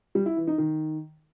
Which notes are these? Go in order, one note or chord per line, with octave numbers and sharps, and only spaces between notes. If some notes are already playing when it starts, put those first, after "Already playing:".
G3
E4
E3
D#4
D#3